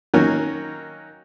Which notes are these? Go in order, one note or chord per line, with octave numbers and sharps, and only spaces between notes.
D#3 F#3 A#3 C#4